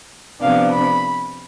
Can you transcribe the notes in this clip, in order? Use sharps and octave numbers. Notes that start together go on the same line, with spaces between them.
C3 F3 B3 D4 F5
B5